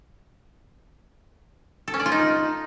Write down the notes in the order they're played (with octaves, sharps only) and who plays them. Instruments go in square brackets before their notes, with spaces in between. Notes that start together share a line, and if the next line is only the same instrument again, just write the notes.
[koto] A4
C#4
D5
F4
D#4